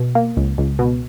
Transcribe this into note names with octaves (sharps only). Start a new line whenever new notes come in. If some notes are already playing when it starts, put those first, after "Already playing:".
Already playing: B2
A#3
C#2
C#2
B2